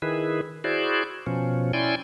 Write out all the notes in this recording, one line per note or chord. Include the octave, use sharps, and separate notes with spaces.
D#3 E4 G#4 B4
E4 F#4 G#4 C5 D5
B2 F3 C#4
C#4 E4 D5 G5 G#5 C6